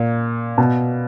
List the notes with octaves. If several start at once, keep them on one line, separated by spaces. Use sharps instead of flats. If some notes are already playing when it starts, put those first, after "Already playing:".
Already playing: A#2
B2